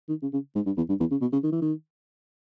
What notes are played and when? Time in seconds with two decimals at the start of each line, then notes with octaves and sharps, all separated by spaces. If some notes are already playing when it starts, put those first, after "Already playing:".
0.09 D#3
0.22 C#3
0.33 C#3
0.56 G#2
0.66 G2
0.77 E2
0.89 G2
1.00 E2
1.11 C#3
1.21 B2
1.33 C#3
1.44 D#3
1.52 E3
1.62 D#3